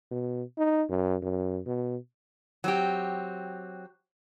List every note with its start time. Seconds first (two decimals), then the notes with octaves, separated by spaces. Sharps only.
0.11 B2
0.58 D#4
0.89 F#2
1.22 F#2
1.66 B2
2.64 F#3 C4 G4